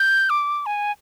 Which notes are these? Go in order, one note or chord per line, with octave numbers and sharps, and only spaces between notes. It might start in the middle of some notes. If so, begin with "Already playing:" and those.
Already playing: G6
D6
G#5